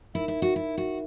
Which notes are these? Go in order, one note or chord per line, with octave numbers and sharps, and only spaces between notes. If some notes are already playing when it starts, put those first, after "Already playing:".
D#4 E4 A#4 E5
E4
F#4
E4
F#4